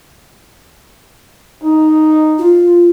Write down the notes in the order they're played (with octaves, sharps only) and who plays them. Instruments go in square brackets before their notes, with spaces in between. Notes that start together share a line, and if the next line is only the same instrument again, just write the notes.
[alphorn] D#4
[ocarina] F4